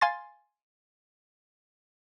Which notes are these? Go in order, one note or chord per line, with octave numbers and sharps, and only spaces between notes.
F5 G#5 C6 A6